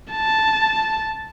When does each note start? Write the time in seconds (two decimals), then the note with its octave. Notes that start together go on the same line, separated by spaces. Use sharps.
0.12 A5